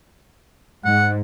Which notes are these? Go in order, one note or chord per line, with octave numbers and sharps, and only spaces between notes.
G#2 F#5